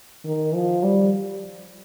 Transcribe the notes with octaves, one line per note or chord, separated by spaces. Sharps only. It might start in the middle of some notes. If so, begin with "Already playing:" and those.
D#3
F3
G3